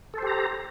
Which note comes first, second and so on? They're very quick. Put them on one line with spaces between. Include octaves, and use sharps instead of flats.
A4 C5 G4 A#5